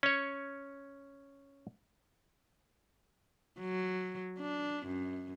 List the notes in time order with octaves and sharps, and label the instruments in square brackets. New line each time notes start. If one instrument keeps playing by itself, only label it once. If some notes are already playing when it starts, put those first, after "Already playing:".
[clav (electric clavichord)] C#4 C#5
[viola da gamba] F#3
D4
F#2